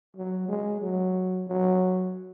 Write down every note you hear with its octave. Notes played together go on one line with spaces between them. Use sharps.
F#3
G#3
F#3
F#3